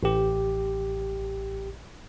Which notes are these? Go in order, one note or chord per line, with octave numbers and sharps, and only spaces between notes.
A1 G4